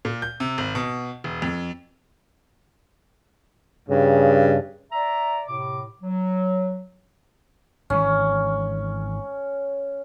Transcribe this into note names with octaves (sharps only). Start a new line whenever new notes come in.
A#2
G6
C3
G#1
B2
E1
F2
G2 C#3
D5 E5 A#5
A2 C3 D6
F#3
G#1 E3 G#3 C#4